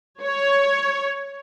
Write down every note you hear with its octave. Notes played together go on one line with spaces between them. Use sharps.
C#5